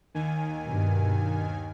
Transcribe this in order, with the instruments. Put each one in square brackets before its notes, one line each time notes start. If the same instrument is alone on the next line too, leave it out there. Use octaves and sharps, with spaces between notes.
[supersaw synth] D#2 D#3 G#5
[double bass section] G2 B2